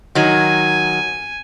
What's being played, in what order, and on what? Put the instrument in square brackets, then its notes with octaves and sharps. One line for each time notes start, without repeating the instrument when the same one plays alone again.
[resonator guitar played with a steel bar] D#3 F#3 [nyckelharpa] G#5